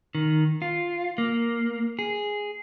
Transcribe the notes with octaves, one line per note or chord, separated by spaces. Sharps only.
D#3
F4
A#3
G#4